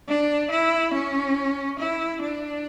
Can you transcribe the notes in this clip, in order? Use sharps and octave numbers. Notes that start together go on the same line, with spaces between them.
D4
E4
C#4
E4
D4